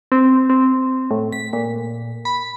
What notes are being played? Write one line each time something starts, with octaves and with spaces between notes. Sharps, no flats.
C4
C4
A2
B6
A#2
B5